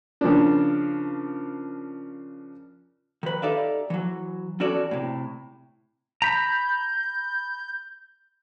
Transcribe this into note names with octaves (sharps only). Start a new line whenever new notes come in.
C#3 F3 A#3 D4
D#3 B4
D#4 G4 A4 D5 E5 F5
E3 F#3
E2 C#4 F#4 A4 D5
A2 C3
A#5 B5 G6